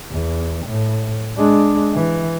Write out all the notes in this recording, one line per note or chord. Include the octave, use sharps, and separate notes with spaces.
E2
A2
G#3 D4
E3